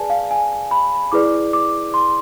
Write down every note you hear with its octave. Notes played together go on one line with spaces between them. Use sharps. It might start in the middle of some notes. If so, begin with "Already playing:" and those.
Already playing: G#4 B4 D5 G#5 A5
F5
G#5
B5
E4 G#4 B4 D5 D6
D6
C6